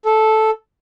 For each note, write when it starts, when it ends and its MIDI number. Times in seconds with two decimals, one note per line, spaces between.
0.05 0.50 69